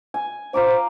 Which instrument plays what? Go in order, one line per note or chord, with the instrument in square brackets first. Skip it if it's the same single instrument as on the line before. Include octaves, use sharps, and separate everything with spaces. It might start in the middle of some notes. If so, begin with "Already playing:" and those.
[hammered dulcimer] G#5
[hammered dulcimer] F4 A#5 D6 [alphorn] C5